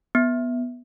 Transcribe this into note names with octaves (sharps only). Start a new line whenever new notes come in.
B3